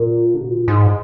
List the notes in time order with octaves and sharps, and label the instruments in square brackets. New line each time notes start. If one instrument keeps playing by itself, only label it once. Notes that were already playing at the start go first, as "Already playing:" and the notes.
Already playing: [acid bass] A#2
D3
B2
A#2
G#2